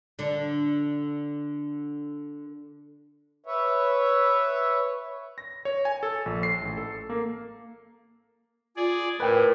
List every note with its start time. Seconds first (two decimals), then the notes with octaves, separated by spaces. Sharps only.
0.19 D3 D4
3.46 B4 C#5 E5
5.38 A#6
5.65 C#5
5.85 G#5
6.03 A4
6.26 A#1
6.43 C7
6.62 A1
6.77 A4
7.10 A#3
8.77 F4 G#4 D5
9.20 A2 A#4 B4 G5